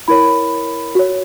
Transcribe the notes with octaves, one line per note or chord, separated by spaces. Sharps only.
E4 A#4 C#5 B5
F#4 C#5